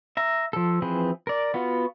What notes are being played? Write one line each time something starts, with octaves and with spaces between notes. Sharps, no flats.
E5 A#5
F3 A4
E3 F3 C4 G#4 B4
A#4 D5
B3 F4 F#4